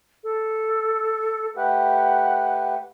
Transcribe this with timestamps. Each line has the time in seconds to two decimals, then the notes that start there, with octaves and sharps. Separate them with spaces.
0.24 A4
1.56 A3 G4 B4 F#5